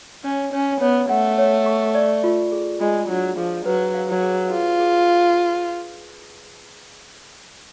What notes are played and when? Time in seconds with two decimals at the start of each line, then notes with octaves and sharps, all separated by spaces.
0.24 C#4 C#5
0.53 C#4 C#5
0.81 B3 C#5
1.09 A3 F#5
1.38 C#5
1.66 C#6
1.95 D5
2.24 F4
2.52 G#4
2.80 G#3 F4
3.09 F#3 D4
3.37 F3 G#4
3.65 F#3 B4
3.94 F5
4.09 F#3
4.23 G#4
4.51 F4 G#4
4.80 G#4